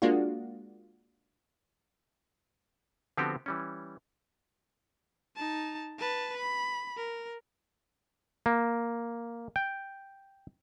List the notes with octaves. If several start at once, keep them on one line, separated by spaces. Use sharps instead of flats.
G#3 A#3 D4 F4 F#4
D3 F3 B3 C4 F#4 G4
E3 G3 C#4
D#4 A5
B4 A5
B5
A#4
A#3
G5